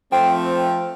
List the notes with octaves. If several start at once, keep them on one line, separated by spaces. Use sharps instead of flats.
F3 A3 C4 G5